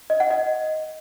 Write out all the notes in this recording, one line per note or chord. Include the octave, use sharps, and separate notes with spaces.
D#5
F#5
D#5